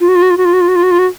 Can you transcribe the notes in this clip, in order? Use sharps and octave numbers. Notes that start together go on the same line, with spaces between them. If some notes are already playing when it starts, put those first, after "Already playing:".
F4
F#4
F4
F#4
F4
F#4
F4
F#4
F4
F#4
F4
F#4
F4
F#4